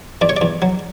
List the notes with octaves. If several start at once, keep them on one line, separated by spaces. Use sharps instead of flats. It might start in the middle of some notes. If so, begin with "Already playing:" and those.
E2 D5
C#5
E2 D5
F#3